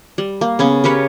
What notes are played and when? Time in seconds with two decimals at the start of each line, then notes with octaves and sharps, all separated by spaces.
0.18 G3
0.41 A#3
0.59 C#3 B3 C#4
0.84 G4 A#4 B4 C#5